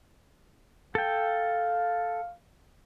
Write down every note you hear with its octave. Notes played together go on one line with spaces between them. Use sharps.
A4 F5 G5